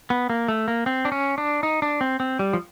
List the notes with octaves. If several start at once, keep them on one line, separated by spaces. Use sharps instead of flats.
B3
A#3
A3
A#3
C4
D4
C#4
D4
D#4
D4
C4
C4
G3
F3